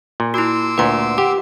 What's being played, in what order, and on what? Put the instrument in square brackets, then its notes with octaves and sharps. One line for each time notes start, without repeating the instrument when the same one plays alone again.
[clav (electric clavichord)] A#2
[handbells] E4 F#4 [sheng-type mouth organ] C6 D6 E6
[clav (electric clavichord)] D2 A#2 [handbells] B4 F#5
[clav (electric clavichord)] G4 [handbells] F#5